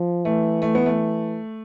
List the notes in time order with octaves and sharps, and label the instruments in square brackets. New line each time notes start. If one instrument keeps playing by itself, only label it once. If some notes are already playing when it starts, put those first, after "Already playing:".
Already playing: [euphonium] F3
[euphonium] E3 [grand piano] A3
[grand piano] A3
B3
A3